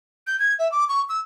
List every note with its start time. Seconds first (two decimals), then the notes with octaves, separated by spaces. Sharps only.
0.27 G6
0.39 G#6
0.59 E5
0.72 D6
0.89 C#6
1.09 E6